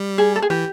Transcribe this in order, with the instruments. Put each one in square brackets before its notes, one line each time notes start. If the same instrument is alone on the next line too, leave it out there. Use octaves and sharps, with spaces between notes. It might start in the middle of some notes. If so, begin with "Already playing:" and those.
Already playing: [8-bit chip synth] G3
[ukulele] G#4
A4
G#4
[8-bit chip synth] E3 [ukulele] G4